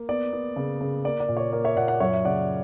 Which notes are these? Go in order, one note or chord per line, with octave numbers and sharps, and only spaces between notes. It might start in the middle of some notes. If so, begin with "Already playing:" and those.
Already playing: A#3
B3 D5
B3
C#3
C#3
A#3 D5
D5
A#2
C#5
A#3 D5
C#5 E5
A#2 D5 F#5
D5 F#5
F#2 C#5 E5
E5
C#3 D5 F#5